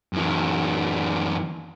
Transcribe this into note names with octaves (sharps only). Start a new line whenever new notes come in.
F#2 E3